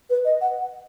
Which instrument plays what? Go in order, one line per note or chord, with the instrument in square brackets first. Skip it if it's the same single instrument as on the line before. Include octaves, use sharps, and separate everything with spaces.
[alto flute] B4
D#5
F#5